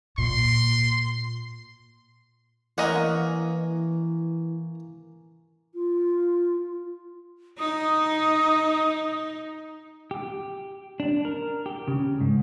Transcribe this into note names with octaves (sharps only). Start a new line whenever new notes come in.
A#2 C6
E3 A#3 C#4 A#4 D#5 F#5
F4
D#4 D#6
G4
D4
A#4
G4
C#3
G#2